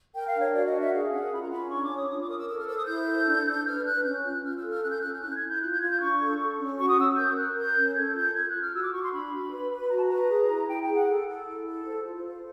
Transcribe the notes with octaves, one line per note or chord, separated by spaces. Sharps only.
A#4 G5
F5
D4
C#5
F#4 D5
D#5
A#4
E5
G#4 F5
C#4 F#5
F4 B5
A#5
C#4 B5
D4 C#6
D6
C#5
D#6
F4 D#6
D6
A#4 D#6
E6
A4 E6
F6
C5 E6
D#6
E4 G6
A4
D4
D4
B4 F6
B4 F#6
C#4 G6
F4 F#6
F4 F6
E6
A4
F6
C#4 F#6
G6
C#4 F#6
F6
E4 F#6
G6
G#6
E4
G6
F4 F#6
G6
F4 G#6
G6
D4 C#6
A4
A4
C#4
F#4 C#6
D#6
C#4 E6
A#4 G6
A#4 F#6
A#4 G6
C#4
A4 G#6
F4 G6
F4 G#6
F#6
F4
F6
F#4 E6
D6
F#4 C#6
C6
D4 B5
F#4
B4
B4
F#4 A#5
A5
B4 A#5
G#4
E4
E4 G5
G5
G#4
F#5
A4
A4
E4
A4
C5
F4
C5